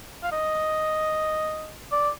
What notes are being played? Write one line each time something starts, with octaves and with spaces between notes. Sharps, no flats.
F5
D#5
D5